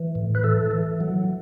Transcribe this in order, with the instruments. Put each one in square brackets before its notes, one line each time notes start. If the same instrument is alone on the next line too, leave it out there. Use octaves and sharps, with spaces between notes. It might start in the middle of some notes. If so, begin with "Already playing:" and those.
Already playing: [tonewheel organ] E3
A2
B4
E3 A4
E3
F#3